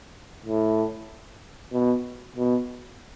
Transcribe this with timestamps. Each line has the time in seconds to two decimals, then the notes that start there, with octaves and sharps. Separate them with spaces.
0.46 A2
1.73 B2
2.36 B2